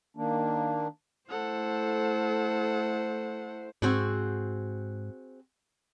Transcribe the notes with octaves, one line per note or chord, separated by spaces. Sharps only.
D#3 A#3 D4
A3 E4 A4 C5 F#5
G#2 C4 F#4 G#4